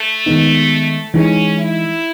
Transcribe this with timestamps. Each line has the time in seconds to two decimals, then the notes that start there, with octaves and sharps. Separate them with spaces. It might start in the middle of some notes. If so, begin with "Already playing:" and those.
Already playing: A3
0.26 D#3 G#3 B3 D#4
1.14 E3 G#3 C#4 D#4
1.58 E4